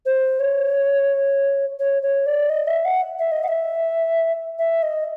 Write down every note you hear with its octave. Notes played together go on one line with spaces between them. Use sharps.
C5
C#5
C#5
C#5
D5
D#5
E5
F#5
E5
D#5
F#5
E5
E5
D#5